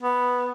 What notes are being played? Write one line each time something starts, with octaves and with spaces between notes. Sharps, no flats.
B3